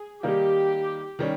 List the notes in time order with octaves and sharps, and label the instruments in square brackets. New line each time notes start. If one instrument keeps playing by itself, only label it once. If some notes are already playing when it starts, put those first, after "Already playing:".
Already playing: [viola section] G#4
[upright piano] D#3 G3 A#3 D#4 [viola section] G4
[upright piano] D#3 G3 C#4